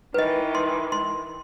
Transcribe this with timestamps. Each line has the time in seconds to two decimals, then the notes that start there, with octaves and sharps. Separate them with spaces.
0.14 D#3 E3 B4 D#5
0.55 C6
0.92 C6